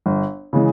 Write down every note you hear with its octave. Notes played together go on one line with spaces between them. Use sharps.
G1
C#3 E3 G#3